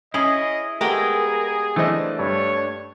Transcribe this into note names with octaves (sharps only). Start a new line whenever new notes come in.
C#4 E4 G#4 D#5
G#3 A3 B3 G4 G#4 A#4
E3 A3 C4 D4 D#5
G2 C#5